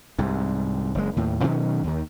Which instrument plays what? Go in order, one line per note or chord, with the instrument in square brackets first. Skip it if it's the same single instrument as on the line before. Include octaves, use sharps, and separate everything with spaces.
[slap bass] C2 G#2
F#1 G#3
D#2 A2
B2 D#3 F#3 C#4
D#2 D#3